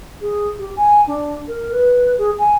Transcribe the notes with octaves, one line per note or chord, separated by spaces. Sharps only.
G#4
G4
G#5
D4
A#4
B4
G#4
G#5